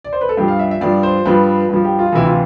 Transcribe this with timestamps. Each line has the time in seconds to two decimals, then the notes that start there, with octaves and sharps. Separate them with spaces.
0.04 D5
0.13 C5
0.21 B4
0.29 A4
0.37 G2 F3 G4
0.48 F5
0.59 E5
0.71 E5
0.81 G2 F3 D5
1.03 C5
1.25 G2 F3 B4
1.69 G2 F3
1.84 G4
1.99 F4
2.12 D2 C3 E3 E4
2.26 F4